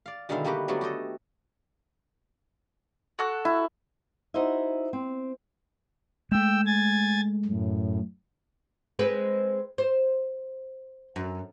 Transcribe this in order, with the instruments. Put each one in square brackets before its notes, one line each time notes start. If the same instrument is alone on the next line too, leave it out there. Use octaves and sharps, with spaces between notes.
[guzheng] D5 F5
B2 D3 D#3 G#3 E4 F5
G3 A#3 B3 F#4 G4 B4
F#3 G3 A3 B3 D4 F#4
F#4 G4 A4 D#5
[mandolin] F#4 A4 F#6
[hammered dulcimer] E4
[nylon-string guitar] D#4 E4 F#4 C5 D#5 E5
C4
[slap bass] G#3 A3 [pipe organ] G5 E6
[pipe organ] G#5 G#6 A6
F#2 A2
[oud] G#3 C4 B4
C5
F#2